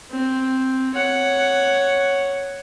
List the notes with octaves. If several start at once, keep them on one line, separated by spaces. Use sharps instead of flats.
C4
C#5 F#5